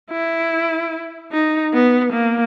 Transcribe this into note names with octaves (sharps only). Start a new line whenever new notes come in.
E4
D#4
B3
A#3